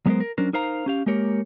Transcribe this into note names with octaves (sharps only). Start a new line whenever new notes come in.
F#3 G#3 B3 G4 A#4 C5
A#4
F#3 C#4 D4 A#4 C5
D#4 A#4 C5 F5 A#5
C#4 G4 F5
G#3 A#3 G4 A#4 C#5